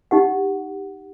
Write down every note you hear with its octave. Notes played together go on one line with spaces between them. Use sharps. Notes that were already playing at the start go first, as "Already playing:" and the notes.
D#4 G4 F#5